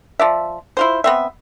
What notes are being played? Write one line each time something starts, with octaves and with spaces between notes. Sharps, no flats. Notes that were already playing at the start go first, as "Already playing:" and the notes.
F3 D5 E5
E4 F4 C5
B3 C4 E5